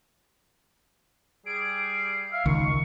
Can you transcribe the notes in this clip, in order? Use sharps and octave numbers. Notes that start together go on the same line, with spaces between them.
G3 G#4 D7
E5 F5
C#2 D#3 C#6